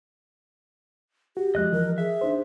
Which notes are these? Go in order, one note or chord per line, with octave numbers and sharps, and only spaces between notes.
F#4 G4
F2 F3 G#3 D#5 F#6
E3 F3 A#4
G#4 E5
D4 D#4 C5